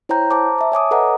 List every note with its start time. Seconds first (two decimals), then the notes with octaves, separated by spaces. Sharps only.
0.09 E4 C5 C#5 G5 A#5 G6
0.31 C5 A5 A#5 D6
0.58 E5 A5
0.72 C#5 G#5 D6 D#6
0.91 A4 B4 D#5 F#5 A#5